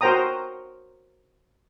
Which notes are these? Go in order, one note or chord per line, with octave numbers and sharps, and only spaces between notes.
F#4 A#4 C5 G5 A#5 D#6